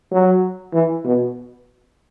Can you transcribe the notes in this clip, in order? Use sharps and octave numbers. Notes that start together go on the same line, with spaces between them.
F#3
E3
B2